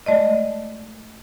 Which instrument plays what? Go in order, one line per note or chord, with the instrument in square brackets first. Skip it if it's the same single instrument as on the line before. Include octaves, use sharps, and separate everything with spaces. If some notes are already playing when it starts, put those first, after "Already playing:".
[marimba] G#3 A3 D5 D#5